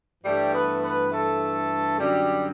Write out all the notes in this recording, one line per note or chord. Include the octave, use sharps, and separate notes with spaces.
G2 E3 G3 A3 G4
B3 B4
B3 B4
A3 A4
F#2 D3 F#3 G3 G4